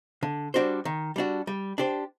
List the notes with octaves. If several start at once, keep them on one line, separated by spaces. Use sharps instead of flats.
D3
G3 D4 F#4 C5
D#3
G3 D4 F#4
G3
D4 G4 C5